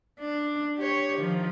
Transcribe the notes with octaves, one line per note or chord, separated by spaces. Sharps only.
D4
G4 C#5
D#3 F3